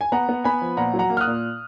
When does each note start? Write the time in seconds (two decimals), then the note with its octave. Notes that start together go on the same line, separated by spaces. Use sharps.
0.01 G#5
0.12 B3 F#5 A#5
0.29 B3
0.44 B3 G#5 B5
0.62 F3
0.77 A#2 F#5 A#5
0.94 F#3
0.99 F#5 A#5
1.10 A#3
1.17 F6
1.21 D#6 F#6
1.27 A#2